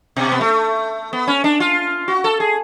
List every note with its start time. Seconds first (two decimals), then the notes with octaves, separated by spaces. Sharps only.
0.16 B2
0.32 B3
0.41 A3
1.13 B3
1.28 C#4
1.44 D4
1.60 F4
2.08 F#4
2.24 A4
2.40 G#4